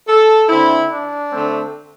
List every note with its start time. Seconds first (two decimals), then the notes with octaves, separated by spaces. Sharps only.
0.08 A4
0.49 D3 C4 E4
0.91 D4
1.32 D3 A3 C4